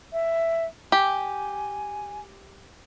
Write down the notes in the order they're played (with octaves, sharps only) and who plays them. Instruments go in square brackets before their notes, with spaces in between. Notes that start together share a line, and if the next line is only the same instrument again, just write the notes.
[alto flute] E5
[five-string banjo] G4 [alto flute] G#5